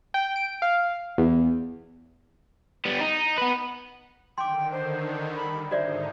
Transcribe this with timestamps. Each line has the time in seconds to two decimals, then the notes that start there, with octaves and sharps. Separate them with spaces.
0.14 G5
0.36 D7
0.62 F5
1.18 E2
2.85 G3 B3
3.00 D#4
3.38 B3 B4
4.38 D3 D#3 G5 C6 D6
4.72 C5
5.36 G3 B5
5.71 G#2 D3 D#4 F#4 C5 D5 E5